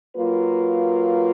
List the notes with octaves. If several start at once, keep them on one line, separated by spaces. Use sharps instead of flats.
F#3 A#3 F4 B4